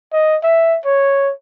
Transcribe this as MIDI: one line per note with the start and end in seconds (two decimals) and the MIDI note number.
0.12 0.36 75
0.43 0.78 76
0.85 1.32 73